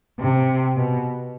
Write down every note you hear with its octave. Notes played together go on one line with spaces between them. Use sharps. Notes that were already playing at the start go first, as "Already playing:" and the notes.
C3
B2